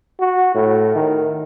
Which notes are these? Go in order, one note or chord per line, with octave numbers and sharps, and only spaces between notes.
F#4
A2
D#3